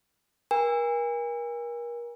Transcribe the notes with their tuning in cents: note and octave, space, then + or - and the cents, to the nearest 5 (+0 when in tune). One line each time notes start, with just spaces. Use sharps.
A#4 +35 G#5 -35